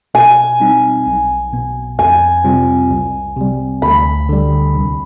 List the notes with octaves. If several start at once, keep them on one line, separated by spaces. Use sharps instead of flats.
B2 G#5
G3 C4 D#4
B1
B2 B3
F2 G#5
C3 G3 C4 F4
C2
C3 G3
D2 B5
D3 G3
C2